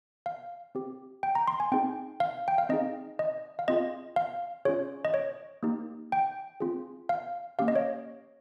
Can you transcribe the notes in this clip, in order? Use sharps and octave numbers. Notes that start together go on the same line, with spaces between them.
F5
C4 G4
G5
A#5
C6
G#5
C4 D#4 G#4 G5
F5
G5
F5
C4 D#4 G#4 D#5
D#5
F5
C4 F4 G#4 D#5
F5
C#4 F4 G#4 C#5
D#5
C#5
A#3 D#4 G4
G5
C4 F4 G#4
F5
A#3 C#4 G4 F5
D#5
C#5